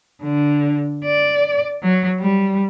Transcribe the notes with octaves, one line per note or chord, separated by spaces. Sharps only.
D3
D5
F#3
G3